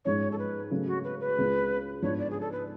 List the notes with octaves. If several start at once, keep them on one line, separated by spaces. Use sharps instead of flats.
G#2 F3 G#3 C#4 C#5
A4
B4
C#3 F#3 A3 C#4
F#4
B4
B4
C#2 C#3 G#3
G#2 F3 B3 D4 C#5
D5
G#4
A4
B4